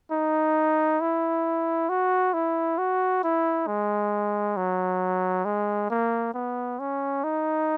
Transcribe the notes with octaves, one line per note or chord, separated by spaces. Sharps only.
D#4
E4
F#4
E4
F#4
E4
G#3
F#3
G#3
A#3
B3
C#4
D#4